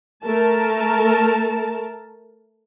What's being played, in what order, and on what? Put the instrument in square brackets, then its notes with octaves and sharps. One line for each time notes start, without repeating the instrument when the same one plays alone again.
[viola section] A3 A#4 A5